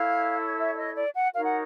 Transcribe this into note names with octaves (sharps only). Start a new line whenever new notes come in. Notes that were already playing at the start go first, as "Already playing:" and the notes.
Already playing: E4 A4 C#5 F5
E5
D5
D#5
D5
F#5
D#4 F#4 A#4 C#5 F5
F#5